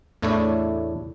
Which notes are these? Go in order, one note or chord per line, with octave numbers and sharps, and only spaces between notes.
E2 A2 A3 D4 E4 C#5